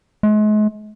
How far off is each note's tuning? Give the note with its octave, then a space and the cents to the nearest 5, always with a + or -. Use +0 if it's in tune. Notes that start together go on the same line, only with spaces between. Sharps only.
G#3 +40